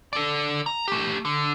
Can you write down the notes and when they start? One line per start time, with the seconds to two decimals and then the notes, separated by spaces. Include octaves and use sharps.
0.13 A4 D5
0.66 A#5
0.88 A3 G4
1.25 D3